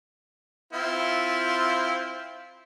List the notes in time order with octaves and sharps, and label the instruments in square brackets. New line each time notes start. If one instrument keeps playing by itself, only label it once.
[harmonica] C4 E4 F4